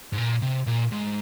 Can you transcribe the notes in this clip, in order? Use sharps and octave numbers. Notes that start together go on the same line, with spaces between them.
G#2
A#2
C3
A#2
G#2